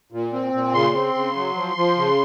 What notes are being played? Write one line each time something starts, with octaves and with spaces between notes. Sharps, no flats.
A#2
C4
A#2
C#3 C6
C4
C#3
F#3
F3
F3
C#3